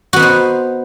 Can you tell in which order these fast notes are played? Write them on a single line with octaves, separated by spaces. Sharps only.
F#4 B3 D#4 C5